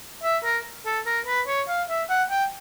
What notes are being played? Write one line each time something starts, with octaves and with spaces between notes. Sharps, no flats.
E5
A#4
A4
A#4
B4
C#5
F5
E5
F#5
G5